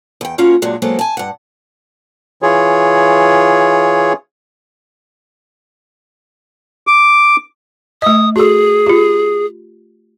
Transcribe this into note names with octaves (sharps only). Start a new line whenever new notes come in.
E2 G5
A#3 C#4 F4 F#4 A#4 C#5
G2 A#2 F#3 G#3 D4
F#3 G#3 A#3 B3 A4 C5
G#5 A5
G2 F#5
E3 F4 G#4 C#5
D6
A3 D#5 D#6
F#4 G#4 A4
F4 G4